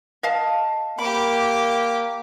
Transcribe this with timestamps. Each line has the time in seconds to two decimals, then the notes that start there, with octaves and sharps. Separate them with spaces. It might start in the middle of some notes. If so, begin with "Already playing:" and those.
0.23 D#5 F5 A5
0.99 A#3 G4 B5 D6